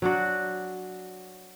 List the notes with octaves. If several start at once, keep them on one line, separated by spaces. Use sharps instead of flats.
F#3 D4 F#4